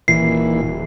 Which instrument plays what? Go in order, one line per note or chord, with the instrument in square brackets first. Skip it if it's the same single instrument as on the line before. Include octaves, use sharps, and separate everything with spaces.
[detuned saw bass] D#1 [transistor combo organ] A#2 E3 [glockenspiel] C7